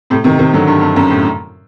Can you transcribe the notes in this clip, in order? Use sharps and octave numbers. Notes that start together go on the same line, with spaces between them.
A2 C3
C3 D#3
C3 D#3
D3 F#3
G2
G2
F#2
A2